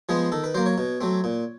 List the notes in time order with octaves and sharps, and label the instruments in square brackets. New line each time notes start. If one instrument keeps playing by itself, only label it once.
[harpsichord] F3 G#3 B3 G#4
D#3 A4
B4
F#3 A#3 C5
C#5
B2
F#3 A3 C4
A#2